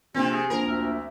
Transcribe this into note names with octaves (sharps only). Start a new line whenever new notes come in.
A#1 C3 C4 G4
G#4
A#1 A#4 C5
D2 E5 E6 F6
E5